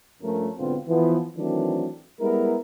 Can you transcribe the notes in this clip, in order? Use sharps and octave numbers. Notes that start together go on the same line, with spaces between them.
G2 F3 A3 A#3 C#4 A#4
B1 G#2 D3 B3 C4 F4
E3 F3 B3
D#3 E3 F#3 A3 C4 D4
G3 G#3 B3 E4 A#4